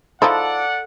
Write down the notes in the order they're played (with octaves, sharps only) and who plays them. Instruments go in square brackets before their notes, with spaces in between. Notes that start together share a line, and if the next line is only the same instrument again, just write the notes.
[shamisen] F3 D#4 E4 [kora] A4 [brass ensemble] D5 F#5